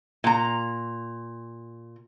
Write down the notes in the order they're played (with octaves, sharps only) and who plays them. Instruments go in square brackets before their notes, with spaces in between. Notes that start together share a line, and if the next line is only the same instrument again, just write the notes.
[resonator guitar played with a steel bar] A#2 A#5